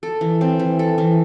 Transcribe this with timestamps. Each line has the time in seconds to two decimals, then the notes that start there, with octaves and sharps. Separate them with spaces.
0.03 A4
0.21 E3
0.41 C4
0.59 E3
0.79 A4
0.98 E3